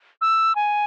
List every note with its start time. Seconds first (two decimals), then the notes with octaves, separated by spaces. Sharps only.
0.21 E6
0.55 G#5